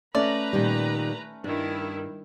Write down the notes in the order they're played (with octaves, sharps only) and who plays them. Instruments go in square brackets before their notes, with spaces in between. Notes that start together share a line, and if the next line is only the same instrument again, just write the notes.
[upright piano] A3 C#4 [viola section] B4 A#5 [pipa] D5
[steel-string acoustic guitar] A#2 D#3 G3
[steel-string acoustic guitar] G2 [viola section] D#3 E4